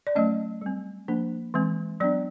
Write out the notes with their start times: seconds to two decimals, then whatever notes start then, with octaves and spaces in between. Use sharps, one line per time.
0.07 D5
0.15 F#3 A3 C#4 D#5
0.62 G3 C4
1.08 F3 A#3 D4
1.54 E3 G#3 C4
2.00 F#3 B3 D4 D5